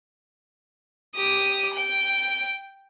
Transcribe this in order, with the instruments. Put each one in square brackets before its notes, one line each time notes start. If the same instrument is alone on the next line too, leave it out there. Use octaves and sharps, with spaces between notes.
[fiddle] G4 D#6
G5